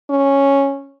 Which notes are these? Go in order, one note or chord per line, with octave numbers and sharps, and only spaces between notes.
C#4